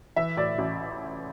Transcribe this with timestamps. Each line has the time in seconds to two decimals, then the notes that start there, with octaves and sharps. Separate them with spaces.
0.16 E3 E5
0.37 A2 D5
0.58 A1